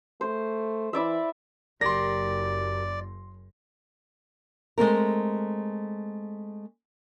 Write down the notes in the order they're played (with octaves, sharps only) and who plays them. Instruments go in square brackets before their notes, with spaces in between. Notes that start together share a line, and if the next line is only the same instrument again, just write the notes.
[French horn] A3 [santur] C5
[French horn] E3 [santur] E4 D5 E5
[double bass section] F#1 [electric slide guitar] G4 A#4 [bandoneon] D5 [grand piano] C6 A#6
[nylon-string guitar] G#3 A3 C4 A#4